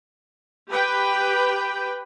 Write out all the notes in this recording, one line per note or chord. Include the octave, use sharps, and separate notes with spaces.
G4 B4 G5